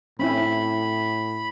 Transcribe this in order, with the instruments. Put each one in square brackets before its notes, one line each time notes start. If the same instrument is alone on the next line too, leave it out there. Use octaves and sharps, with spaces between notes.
[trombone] A2 [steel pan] C4 C#4 E4 [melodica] B5